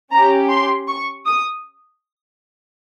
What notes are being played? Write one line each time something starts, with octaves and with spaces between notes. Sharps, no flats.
C#4 G4 A#5
C6
C#6
D#6